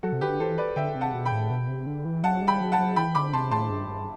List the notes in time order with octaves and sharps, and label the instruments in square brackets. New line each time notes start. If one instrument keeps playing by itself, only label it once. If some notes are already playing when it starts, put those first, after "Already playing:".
[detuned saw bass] F#3 [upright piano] F#4 A4
[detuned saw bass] C3
[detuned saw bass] D3 [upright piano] G4 B4
[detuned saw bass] E3 [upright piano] A4 C5
[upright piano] B4 D5
[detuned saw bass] D3 [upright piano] E5 G5
[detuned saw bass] C3
[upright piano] F#5 A5
[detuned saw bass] B2
[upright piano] G5 B5
[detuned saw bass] A2
B2
C3
D3
E3
[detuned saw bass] F#3 [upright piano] F#5 A5
[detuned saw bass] G3
[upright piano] G5 B5
[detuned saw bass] F#3
[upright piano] F#5 A5
[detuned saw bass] F#3
[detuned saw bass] E3 [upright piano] G5 B5
[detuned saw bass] D3 [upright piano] B5 D6
[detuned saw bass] C3 [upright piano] A5 C6
[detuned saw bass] A2 [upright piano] A5 C6
[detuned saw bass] G2
G2